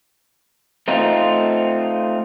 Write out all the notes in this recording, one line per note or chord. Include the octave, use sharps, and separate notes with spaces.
A3 C4 D#4 F4